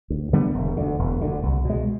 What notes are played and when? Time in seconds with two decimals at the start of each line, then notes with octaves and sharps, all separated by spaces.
0.10 D2
0.33 D3 G3 B3
0.54 E1
0.77 D2 D3
0.99 E1
1.21 D2 D3
1.43 C2
1.65 B2 G#3